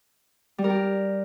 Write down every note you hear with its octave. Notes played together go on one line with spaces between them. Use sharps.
G3
A#4
G4